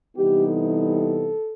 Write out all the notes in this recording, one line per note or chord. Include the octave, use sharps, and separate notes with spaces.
C3 E3 G3 B3 D#4 G4
A4